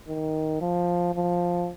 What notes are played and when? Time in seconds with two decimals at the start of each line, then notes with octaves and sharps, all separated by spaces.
0.08 D#3
0.61 F3
1.15 F3